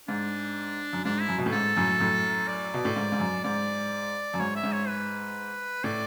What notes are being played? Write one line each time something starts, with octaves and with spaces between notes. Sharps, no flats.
G#2 D4
F#2
G#2 D4
E4
F#2
B2
A2
G#2 A4
F#2 A2
F#2 A2
D5
B2
A2
G#2
G#2
F#2
G#2 D5
F#2
G#2 C#5
E5
G#2
C#5
B4
A2 D5